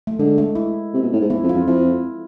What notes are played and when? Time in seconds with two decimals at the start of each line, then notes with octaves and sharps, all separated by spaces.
0.07 A3
0.19 D3 G#3
0.38 A3
0.55 E4
0.94 C3
1.02 B2
1.12 A2
1.21 G#2
1.30 E2 E4
1.43 F2
1.49 F4
1.55 F2
1.67 F2 E4